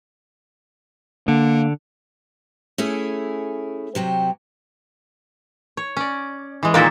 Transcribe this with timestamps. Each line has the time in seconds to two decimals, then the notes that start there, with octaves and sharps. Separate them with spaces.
1.28 D3 A#3
2.78 A3 C#4 E4 G#4
3.95 C3 F#3 G4
5.77 C#5
5.97 C#4 D5
6.63 E3 G#3
6.74 A#2 D#3 A#3 E5